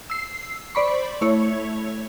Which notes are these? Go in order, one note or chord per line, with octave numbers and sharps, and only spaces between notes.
E6 C7
C5 D5 B5 C#6
A3 E4 C#5